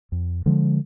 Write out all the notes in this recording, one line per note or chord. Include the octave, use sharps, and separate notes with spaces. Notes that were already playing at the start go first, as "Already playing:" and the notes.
F2
D3 F3 G#3